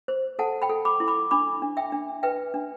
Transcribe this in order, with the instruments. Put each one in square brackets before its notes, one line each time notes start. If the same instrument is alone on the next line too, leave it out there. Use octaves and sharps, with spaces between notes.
[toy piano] C5
A4 F#5 A5
G5 B5
A4
B5 D6
E4
B5 D6
D4 B5 D6
D4
E5 G5
D4
B4 E5 G5
D4